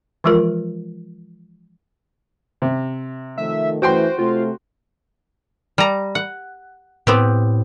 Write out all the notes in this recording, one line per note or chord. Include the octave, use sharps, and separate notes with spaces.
E3 F3 G#3 F4 A#4
C3
D#3 F3 A3 E5
E3 A3 E4 F#4 C5 G5 C6
C3 A3 C4 F4
G3 A#5
F#5
A2 B3 C4 G4